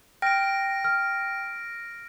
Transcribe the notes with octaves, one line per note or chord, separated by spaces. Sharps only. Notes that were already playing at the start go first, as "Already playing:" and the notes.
G5 F6 A#6 D7
F6